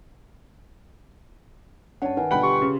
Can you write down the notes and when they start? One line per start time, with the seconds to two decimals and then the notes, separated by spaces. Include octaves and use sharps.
2.02 G2 C#4 C#5 F#5 A5
2.17 D#3 B4 F#5 G#5
2.31 B2 D3 G3 F4 B4 F#5 G5 B5
2.43 G4 C6 C#6
2.62 C#3